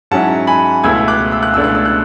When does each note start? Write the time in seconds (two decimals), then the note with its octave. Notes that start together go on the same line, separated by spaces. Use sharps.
0.11 G#2 F#3 C#4 E4 F#5 A5
0.47 G#5 B5
0.84 C#2 B2 A3 E4 E6 G#6
1.08 D6 F#6
1.32 E6
1.43 F#6
1.54 C#2 B2 A3 D4 E6
1.64 F#6
1.75 E6
1.85 F#6